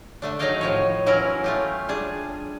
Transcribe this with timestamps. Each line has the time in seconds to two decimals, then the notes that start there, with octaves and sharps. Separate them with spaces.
0.22 D3 A3 D4
0.39 F#3 D#4 G#4 D#5 F5 G5
0.61 A2 F3 C#5
1.06 E3 F#3 C#4 E4 F#4 A#4
1.44 A3 F4 G4
1.89 G3 D4 G#4